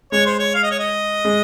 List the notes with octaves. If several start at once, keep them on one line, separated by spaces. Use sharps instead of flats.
G#3 C#5
C5
C#5
F5
D#5
C#5
D#5
G#3